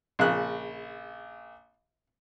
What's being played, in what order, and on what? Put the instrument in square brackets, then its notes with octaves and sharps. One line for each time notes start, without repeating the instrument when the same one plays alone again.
[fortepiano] A#1 C#3 F#6